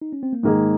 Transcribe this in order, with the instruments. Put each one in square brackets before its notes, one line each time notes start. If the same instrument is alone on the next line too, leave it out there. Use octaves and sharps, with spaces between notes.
[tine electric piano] D#4
C#4
C4
A#3
[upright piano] G#2 D#3 A#3 D#4 G#4 [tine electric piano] G#3